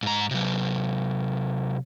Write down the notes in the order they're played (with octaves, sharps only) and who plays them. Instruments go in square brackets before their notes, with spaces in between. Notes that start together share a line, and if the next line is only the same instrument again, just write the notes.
[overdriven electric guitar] G#2 A#5
C3 F#3